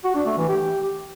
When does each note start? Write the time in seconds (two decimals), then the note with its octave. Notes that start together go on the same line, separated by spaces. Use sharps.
0.04 F#4
0.15 D4
0.26 A3
0.37 E3
0.48 G4